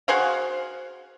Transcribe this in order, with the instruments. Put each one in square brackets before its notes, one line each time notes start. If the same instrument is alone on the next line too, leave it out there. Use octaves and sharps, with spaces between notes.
[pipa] F#4 G#4 C5 F5